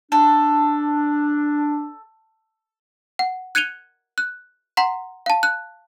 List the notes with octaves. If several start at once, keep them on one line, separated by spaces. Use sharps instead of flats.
D4 A4
F#5
F#6 G#6 C#7 D#7 F7 G7
F#6
F#5 A#5 C6 B6
F5 A5
F#6